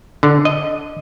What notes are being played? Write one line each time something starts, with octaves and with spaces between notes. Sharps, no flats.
D3
D#5